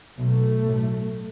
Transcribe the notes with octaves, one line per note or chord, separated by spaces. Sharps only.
B1 B2 A3
B1 A2